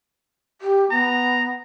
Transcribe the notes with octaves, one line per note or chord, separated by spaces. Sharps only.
G4
B3 A#5